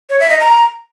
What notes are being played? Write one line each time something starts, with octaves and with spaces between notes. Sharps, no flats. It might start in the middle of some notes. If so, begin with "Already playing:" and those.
C#5
E5
D#5
A#5